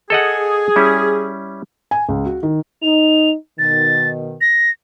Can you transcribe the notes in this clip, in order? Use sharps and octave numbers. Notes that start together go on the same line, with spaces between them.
G#4 A4 D#5 F#5
G3 C#4 E4
G#5
C#2
F#4
D#3
D#4 F7
B2 D#3 A6
A#6